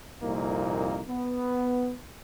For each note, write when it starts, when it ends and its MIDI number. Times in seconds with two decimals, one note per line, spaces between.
0.22 1.02 36
0.22 1.02 41
0.22 1.02 46
0.22 1.02 58
0.22 1.02 63
1.08 1.93 59